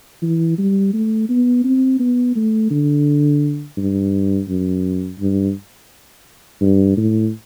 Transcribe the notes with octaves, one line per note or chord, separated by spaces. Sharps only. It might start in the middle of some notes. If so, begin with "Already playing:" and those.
E3
G3
A3
B3
C4
B3
A3
D3
G2
F#2
G2
G2
A2